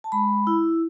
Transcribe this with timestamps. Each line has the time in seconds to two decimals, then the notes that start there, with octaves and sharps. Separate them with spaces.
0.04 A5
0.12 G#3 B5
0.47 E4